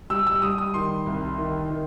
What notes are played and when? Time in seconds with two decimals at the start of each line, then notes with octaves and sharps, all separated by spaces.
0.10 G3 E6
0.27 E6
0.42 G3 D#6
0.58 D#6
0.74 D#3 C6
1.06 C2
1.38 D#3
1.70 D#3